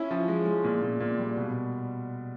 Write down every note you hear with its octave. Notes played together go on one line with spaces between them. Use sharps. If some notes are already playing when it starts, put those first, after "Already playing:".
Already playing: C#4 E4
F3
G#3
G#3
A#2
A#2
A#2
G3
B2